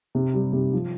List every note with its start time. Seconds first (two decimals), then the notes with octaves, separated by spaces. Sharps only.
0.15 C3
0.34 G3
0.53 C3
0.73 F3